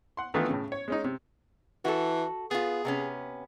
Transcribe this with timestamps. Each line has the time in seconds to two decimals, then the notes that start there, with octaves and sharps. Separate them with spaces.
0.17 F#5 C6
0.34 D#3 E3 A3 B3 D4 F4
0.49 A2 C#3
0.72 C#5
0.88 G#3 C#4 D#4
1.04 C3
1.85 E3 F#4 A4
2.51 B3 F4 G#4
2.85 C3 B3 C#4